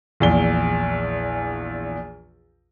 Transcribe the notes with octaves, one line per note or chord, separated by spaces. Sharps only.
A#1 E2 G7